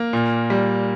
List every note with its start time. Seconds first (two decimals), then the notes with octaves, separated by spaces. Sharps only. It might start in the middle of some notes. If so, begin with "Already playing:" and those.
Already playing: A#3
0.13 A#2
0.50 G3